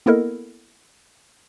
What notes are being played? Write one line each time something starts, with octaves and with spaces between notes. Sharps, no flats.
A#3 B3 E4 A4 A#4 D#5